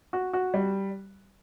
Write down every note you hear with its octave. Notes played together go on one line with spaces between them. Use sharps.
F#4
F#4
G3